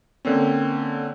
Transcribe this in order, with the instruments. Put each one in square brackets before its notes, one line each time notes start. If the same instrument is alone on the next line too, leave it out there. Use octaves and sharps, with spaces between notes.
[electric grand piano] D3 A#3 C4 C#4